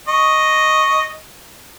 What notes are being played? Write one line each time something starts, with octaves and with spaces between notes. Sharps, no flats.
D#5 C#6